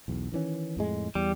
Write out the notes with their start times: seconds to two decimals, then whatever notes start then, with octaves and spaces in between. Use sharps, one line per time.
0.08 B1 E2
0.32 D#3 E3 C#4
0.77 F2 A2 G#3
1.15 E2 G3